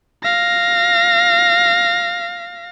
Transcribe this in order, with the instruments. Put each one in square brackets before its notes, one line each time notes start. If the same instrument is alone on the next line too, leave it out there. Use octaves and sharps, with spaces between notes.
[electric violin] F5 A#6